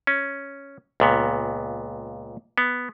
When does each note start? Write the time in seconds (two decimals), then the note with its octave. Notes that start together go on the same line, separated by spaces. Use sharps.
0.07 C#4
1.00 C#2 A#2 B3
2.58 B3